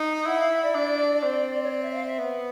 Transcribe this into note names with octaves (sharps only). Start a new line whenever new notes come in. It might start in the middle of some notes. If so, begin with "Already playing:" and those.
Already playing: D#4
E4 F#5
F5
E5
D5
D4
C4
C#5
D5
E5
F5
E5
B3